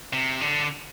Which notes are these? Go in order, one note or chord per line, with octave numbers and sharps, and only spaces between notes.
C3
D3